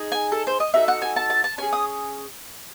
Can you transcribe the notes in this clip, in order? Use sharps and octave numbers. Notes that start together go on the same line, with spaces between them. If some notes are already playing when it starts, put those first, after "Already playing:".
Already playing: D#4 G#4
G#5
A4
C5
D#5
D#4 F#4 A4 E5
F#5
G#5
A5
A5
A5
C#4 G#4 G#5
D#6